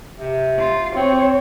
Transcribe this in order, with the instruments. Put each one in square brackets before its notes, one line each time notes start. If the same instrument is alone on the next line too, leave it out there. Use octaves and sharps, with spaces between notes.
[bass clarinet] C3
[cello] F4
[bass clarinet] C4 [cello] C#5